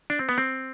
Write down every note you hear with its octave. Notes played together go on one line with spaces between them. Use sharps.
D4
C4
B3
C4